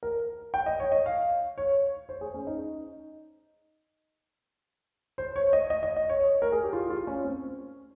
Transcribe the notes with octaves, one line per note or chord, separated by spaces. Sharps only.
A#4
G5
D#5
C#5
D#5
F5
C#5
C5
G#4
C#4
D#4
C5
C#5
D#5
D#5
D#5
D#5
C#5
A#4
G#4
G4
F4
F4
C#4
C4